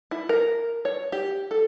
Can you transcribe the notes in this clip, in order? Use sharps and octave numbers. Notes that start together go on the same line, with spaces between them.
E4
A#4
C#5
G4
A4